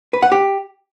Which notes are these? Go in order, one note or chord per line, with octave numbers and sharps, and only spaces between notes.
B4
F#5
G4